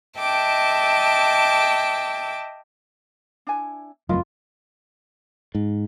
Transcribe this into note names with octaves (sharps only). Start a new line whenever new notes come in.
D#5 E5 G5 A5 D6
D4 E4 G#5
F#1 F2 F#3 A3 E4 F4 A#4 D#5
G#2